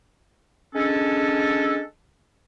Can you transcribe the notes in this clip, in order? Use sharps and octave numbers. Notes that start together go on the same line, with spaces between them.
G#3 C#4 D4 A4